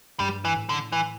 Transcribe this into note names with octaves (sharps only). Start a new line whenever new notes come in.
G2 G3
E3
A2
D3
E3